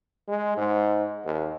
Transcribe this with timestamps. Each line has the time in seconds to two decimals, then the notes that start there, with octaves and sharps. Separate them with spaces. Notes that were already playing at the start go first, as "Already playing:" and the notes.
0.28 G#3
0.57 G#2
1.25 D#2